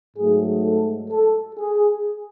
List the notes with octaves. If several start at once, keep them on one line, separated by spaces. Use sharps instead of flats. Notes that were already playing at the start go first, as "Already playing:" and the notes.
G#2 F#3 A3 G#4
A4
A4
G#4